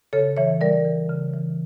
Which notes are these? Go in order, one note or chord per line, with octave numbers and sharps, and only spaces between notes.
C#3 A4 C#5
E3 C#5 E5
G3 A#4 D5
E3
C#3
E3